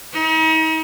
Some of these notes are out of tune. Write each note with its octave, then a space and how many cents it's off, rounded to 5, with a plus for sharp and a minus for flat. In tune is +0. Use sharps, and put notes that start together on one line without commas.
D#4 +40